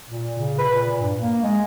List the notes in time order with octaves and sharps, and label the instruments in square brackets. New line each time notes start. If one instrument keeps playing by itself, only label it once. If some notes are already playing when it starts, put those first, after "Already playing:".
[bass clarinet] A#2
C#3
B4
A#2
G2
A#3
G#3